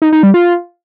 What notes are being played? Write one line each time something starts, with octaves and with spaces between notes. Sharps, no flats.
D#4
D#4
G3
F4